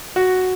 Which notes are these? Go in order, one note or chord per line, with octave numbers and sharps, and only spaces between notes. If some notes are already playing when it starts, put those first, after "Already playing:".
F#4